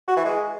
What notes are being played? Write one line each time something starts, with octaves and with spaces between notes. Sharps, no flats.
F#4
E3
G#3